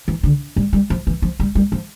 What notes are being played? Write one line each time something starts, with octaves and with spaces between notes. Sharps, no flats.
E3
D3
G3
G3
F3
E3
F3
G3
G3
F3